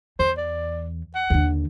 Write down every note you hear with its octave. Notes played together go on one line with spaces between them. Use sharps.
E2 C5
D5
F#5
D#2 D3